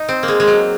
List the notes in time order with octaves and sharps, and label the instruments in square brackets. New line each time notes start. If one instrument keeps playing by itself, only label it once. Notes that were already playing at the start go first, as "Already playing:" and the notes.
Already playing: [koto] D#4
C4
A#3
G#3
G#3
F#3